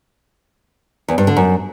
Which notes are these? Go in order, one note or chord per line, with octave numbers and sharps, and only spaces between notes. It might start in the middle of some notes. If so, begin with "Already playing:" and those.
E2
G2
D3
F#2